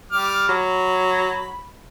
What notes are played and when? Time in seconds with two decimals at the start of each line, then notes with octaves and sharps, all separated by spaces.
0.12 G3 D6 F6
0.49 F#3 B5